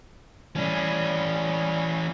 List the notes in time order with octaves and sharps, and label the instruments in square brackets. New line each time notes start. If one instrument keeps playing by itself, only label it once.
[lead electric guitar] E3 C#4 [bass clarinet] G3